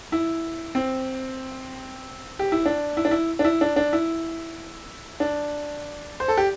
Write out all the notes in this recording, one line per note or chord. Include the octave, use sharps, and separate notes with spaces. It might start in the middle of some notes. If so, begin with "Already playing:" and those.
E4
C4
G4
E4
D4
E4
D4
E4
D4
E4
D4
D4
E4
D4
C5
A4
G4